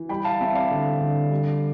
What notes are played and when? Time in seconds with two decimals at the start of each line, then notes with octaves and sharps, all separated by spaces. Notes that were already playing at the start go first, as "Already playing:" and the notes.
Already playing: E3
0.09 G3 G5 B5
0.25 F5 A5
0.40 C4 E5 G5
0.55 D5 F5
0.71 D3
1.00 D3
1.31 G3